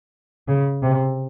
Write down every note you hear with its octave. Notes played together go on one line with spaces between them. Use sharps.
C#3
C3